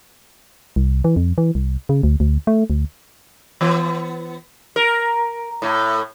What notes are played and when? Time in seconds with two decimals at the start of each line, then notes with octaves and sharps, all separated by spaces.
0.76 C2
1.04 E3
1.16 F2
1.38 E3
1.55 C2
1.89 C#3
2.03 D2
2.20 D2
2.47 A3
2.70 D2
3.61 E3 B3
4.76 A#4
5.62 A2 A3